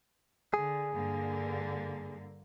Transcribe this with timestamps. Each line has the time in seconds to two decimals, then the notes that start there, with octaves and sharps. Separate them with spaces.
0.54 D3 G#4
0.94 G2 D3 A#3